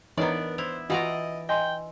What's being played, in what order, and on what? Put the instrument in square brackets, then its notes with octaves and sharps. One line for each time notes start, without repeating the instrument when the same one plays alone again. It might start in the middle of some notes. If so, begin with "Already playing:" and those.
[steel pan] E3 D#4 C#5 [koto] B3 D4 D5 [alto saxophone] A#4
[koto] E4 [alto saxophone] C5 [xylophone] F7
[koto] E3 D5 A#5 [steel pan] F4 F#4 [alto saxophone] D#5
[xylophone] D#5 G#5 C6 [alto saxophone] G5